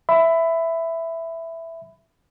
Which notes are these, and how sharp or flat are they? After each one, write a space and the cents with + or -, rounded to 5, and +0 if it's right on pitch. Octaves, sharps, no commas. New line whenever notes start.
E5 +0 B5 +20